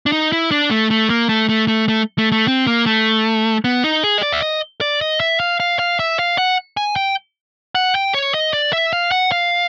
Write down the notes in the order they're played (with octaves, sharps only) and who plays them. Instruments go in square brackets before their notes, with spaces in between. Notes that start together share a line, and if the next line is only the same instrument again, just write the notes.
[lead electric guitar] D4
D#4
E4
D4
A3
A3
A#3
A3
A3
A3
A3
A3
A3
C4
A#3
A3
B3
D#4
G#4
D#5
D5
E5
D#5
D5
D#5
E5
F5
F5
F5
E5
F5
F#5
G#5
G5
F#5
G5
C#5
D#5
D5
E5
F5
F#5
F5